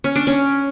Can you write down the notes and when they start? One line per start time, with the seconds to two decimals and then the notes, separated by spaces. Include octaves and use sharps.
0.04 C#4
0.16 D4
0.27 C#4